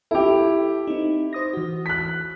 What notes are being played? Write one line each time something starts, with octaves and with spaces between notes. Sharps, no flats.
E4 G4 A4
C4 D#4
C5 D#6 A#6
E3 F#4
F#6 B6